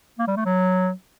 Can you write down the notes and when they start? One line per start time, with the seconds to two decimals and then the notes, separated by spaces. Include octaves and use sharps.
0.18 A#3
0.27 G3
0.36 A3
0.45 F#3